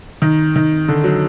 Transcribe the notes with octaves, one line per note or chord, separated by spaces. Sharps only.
D#3
D#3
D3
F#3